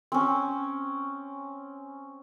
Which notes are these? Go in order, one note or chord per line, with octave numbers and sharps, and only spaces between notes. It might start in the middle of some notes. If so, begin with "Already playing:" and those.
C4 C#4